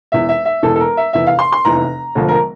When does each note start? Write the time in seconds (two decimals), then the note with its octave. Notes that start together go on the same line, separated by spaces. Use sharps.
0.12 E1 E2 E3 E5
0.29 E5
0.45 E5
0.63 E1 E2 E3 A4
0.76 A4
0.80 A#4
0.97 E5
1.13 F1 E2 E3 E5
1.27 F5
1.39 C6
1.52 C6
1.65 F1 E2 E3 A#5
2.15 E1 D2 D3 F3
2.28 A#4